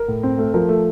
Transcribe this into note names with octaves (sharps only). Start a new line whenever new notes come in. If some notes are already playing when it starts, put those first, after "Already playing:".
Already playing: A#4
A2
C4
A3
F3 A#4
A3